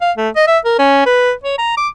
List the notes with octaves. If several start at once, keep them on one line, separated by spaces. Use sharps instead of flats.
F5
A3
D#5
E5
A#4
C#4
B4
C#5
A#5
D6